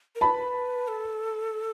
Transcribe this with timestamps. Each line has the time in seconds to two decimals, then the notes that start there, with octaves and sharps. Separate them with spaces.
0.15 A#4
0.21 B4 A5 B5
0.88 A4